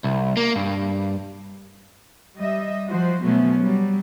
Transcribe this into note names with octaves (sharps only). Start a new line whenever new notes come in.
C2
A#3
G2
G3 D#5 E5
F3 F#4 C5
B2 F#3 A3 B3 C#4
F#3 G3